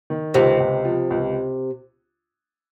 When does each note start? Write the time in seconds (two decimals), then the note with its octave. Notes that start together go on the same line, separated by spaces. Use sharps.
0.10 D#3
0.34 C#2 C3
0.60 C#2
0.85 F3
1.10 C#2